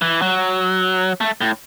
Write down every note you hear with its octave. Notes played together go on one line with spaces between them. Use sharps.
E3
F#3
A3
A2